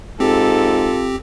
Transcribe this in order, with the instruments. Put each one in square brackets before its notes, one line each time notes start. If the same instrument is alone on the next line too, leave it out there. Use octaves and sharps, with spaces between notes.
[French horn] G#2 [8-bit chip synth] C4 G4 [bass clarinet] F4 [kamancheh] A4